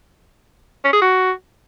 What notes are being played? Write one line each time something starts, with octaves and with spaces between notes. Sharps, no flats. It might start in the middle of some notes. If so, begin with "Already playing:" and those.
C#4
G#4
F#4